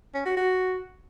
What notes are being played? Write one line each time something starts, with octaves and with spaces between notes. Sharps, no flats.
C#4
F#4
F#4